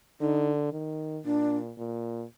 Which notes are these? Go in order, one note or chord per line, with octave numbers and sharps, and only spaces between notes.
D3 D#4
D#3
A#2 D4
A#2